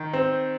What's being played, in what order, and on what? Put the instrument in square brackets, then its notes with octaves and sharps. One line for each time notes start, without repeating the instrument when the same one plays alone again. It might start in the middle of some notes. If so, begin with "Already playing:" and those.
Already playing: [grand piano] D#3
C4